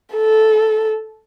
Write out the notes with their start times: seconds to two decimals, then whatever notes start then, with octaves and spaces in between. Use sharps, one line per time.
0.14 A4